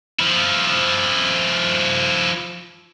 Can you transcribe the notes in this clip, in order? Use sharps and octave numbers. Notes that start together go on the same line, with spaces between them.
F3 E4